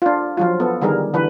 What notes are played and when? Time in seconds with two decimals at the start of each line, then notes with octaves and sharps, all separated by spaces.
0.02 D4 F4
0.37 F3 F#3 F4
0.60 B3 A4
0.82 D3 D#3 G3 G#4 A#4
1.14 D3 E3 B4